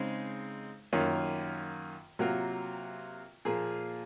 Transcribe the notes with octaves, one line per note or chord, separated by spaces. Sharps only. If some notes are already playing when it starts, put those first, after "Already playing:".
Already playing: C#3 G#3 C4 D#4
F#2 D#3 A#3 C#4 F4
C3 F#3 A#3 F4 A#4
A#2 F3 A#3 F4 G#4